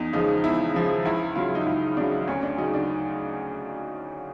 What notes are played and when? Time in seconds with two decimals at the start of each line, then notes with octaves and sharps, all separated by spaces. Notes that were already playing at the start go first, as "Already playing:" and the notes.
Already playing: E2 D#4
0.13 C#3 F3 G#3 D#4
0.44 E2 E4
0.74 C#3 F3 G#3
1.05 C#2 E4
1.36 C#3 F#3 F4
1.55 D#4
1.66 C#2 E4
1.97 C#3 F#3 D4
2.28 D2 C#4
2.43 D4
2.58 C#3 F#3 D#4
2.74 D4